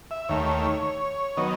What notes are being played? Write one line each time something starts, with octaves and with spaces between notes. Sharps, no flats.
E5
D#2 D#3 A3 C#5
D#3 F#3 B3 D#5